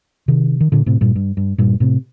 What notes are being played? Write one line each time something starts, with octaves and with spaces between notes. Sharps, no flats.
C3 D#3
D#3
A#2 D3
A2 C3
G2 A#2
G2
G2
G2 A#2
A2 C3